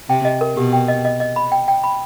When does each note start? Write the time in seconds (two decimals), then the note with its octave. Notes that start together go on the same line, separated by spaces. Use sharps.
0.09 C3 G5
0.25 D#5
0.41 A#4
0.56 B2 G4
0.73 G5
0.88 D#5
1.05 D#5
1.20 D#5
1.36 B5
1.52 G5
1.68 G5
1.84 B5